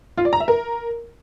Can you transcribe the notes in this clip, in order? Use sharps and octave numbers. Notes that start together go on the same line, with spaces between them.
F4
D5
A#5
E5
A#4